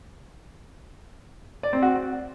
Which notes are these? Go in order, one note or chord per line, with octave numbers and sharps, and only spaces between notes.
D5
C4
F#4